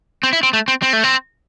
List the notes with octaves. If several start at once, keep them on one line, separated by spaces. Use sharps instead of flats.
C4
E4
C4
A3
C4
C4
A3
C4